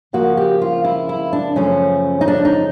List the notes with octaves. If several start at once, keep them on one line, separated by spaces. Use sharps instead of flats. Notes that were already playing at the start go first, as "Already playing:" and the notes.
C#3 F3 A#3 F#4
G4
F4
E4
E4
D4
F#2 C#3 F3 A3 C#4
D#4
D4
D#4